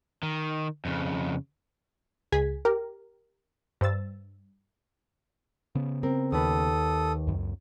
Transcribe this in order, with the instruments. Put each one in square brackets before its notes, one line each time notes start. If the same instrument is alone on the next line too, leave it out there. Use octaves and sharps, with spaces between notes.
[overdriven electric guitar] D#3
F2 C#3
[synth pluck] C#2 G#4 G#6 B6
G4 A#4
G2 C5 E6 A6
[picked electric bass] C#3 B3
[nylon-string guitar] C4 A#4
[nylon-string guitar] D#2 D#4 B4 [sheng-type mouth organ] A4 D#6
[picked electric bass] C#2 F#2